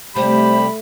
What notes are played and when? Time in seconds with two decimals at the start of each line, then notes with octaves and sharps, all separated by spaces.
0.16 C3 G3 A3 G4 C5 B5